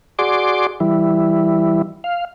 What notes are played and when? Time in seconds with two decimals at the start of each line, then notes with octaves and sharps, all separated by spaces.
0.19 F#4 G#4 D5 C6 D6
0.80 E3 G3 E4
2.04 F5